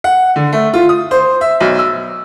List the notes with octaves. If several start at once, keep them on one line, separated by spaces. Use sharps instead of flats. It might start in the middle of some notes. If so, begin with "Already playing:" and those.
F#5
D3
A3
F4
D#6
C5
E5
B1
E6